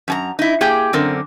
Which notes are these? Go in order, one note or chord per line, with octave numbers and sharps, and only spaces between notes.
F#2 G#5 A#5
D#4 E4
A#3 G4 G#4 G5
F#2 D3 C4 A#4